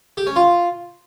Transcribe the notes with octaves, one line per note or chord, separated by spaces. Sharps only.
G4
C#4
F4